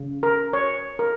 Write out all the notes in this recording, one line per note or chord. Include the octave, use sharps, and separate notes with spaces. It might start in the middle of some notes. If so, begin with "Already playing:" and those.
Already playing: C#3
A#4
C#5
A#4